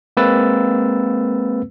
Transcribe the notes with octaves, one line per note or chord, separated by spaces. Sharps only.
G#3 A#3 C4 B4 E6 A6